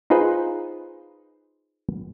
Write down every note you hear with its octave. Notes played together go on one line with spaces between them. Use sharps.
D#4 F4 G#4 B4 C5